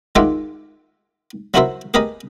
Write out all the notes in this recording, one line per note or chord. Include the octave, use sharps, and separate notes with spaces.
D#3 G#3 F4 E5 F#5 D6
F#3 E4 F#4 A#4 C5 E5
G4 G#4 A#4 B4 D#5